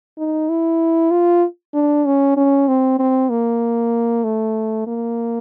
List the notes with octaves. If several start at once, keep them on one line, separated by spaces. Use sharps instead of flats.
D#4
E4
F4
D4
C#4
C#4
C4
C4
A#3
A3
A#3